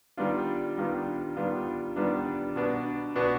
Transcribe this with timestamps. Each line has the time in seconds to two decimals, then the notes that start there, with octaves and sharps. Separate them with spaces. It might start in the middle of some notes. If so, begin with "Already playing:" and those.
0.17 D#3 G3 B3 D4 F4
0.77 D#3 G3 B3 D4 F4
1.37 D#3 G3 B3 D4 F4
1.96 D#3 G3 B3 D4 F4
2.56 B2 B3 D4
3.16 B2 B3 D4